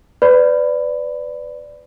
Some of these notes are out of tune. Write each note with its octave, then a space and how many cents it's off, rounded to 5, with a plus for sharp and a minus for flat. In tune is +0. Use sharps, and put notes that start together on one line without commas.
B4 +25 D5 +0 B5 +15